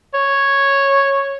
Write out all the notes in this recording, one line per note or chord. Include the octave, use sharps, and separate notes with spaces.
C#5